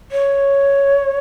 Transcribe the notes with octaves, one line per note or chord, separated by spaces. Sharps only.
C#5